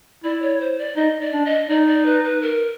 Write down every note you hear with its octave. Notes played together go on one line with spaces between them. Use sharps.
E4 D5
C#5
C5
D5
D#4 D#5
D5
D4
D#5
D#4 D5
D5
B4
B4
A#4